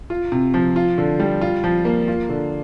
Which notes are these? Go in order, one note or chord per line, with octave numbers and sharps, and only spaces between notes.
F4
C3
F3
F4
D3
G3
F4
F3
A#3
F4
D3